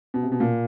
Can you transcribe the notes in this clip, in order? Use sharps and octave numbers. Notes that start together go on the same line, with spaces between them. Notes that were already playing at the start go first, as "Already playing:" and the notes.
B2
C3
B2
A#2